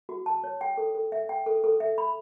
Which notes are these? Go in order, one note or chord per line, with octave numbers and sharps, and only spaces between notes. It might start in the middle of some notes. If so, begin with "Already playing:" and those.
F#4
A5
C#5
G5
A4
A4
E5
G5
A4
A4
E5
B5